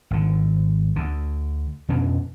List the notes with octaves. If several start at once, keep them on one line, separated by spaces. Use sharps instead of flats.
G#1 D3
D2 D3
F2 B2 C#4 D4